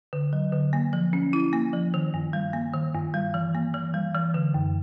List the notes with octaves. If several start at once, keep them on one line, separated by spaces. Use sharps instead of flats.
D3
F#3
D3
A#3
F3
C#4
E4
A#3
F3
D#3
G2
G3
A#3
D#3
G2
G3
E3
A#3
E3
G3
E3
D3
F#2